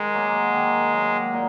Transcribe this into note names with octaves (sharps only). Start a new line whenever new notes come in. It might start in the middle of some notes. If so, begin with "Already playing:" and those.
Already playing: D#3 G#3
F#3 A#3
D#3
F#3 A#3
A#2